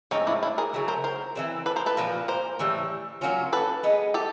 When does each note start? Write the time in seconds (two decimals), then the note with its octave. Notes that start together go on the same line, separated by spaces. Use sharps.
0.11 A2 F3 G#3 C4 C#4 D#4
0.27 D4 E4
0.43 D4 E4
0.58 G#4 A#4
0.73 C#3 F#3 A3
0.88 A#4 C5
1.04 A#4 C5
1.35 E3 G3 C4
1.66 A4 B4
1.76 A#4 C5
1.86 A4 B4
1.97 A#2 F3 A#3
2.28 A#4 C5
2.59 A2 E3 G3
3.21 F#3 A#3 C#4 F4
3.53 A4 B4
3.83 G#3 B3 D#4
4.14 G4 A4